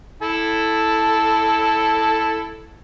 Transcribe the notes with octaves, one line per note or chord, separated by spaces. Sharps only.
E4 A4 A5